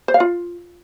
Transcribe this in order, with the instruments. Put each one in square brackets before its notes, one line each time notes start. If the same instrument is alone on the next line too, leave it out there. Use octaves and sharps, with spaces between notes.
[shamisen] C5
F5
F4